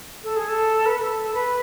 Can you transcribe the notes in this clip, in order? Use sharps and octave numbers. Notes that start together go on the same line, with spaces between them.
A4
G#4
A4
B4
B4
A4
A4
B4